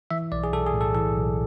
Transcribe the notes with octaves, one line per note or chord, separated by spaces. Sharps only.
E3 E5
B1 D5
G#4
B1 A4
G#4
A2
A4
E3 A4
B1